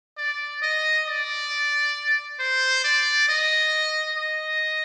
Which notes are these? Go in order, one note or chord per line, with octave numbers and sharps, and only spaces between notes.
D5
D#5
D5
C5
D5
D#5
D#5